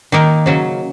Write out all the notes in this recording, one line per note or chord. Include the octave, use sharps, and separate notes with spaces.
D#3 A#3 D#4 A#4
C#3 F#3 C#4